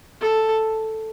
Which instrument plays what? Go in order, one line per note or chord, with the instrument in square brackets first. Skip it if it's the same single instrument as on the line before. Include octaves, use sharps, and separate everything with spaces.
[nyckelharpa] A4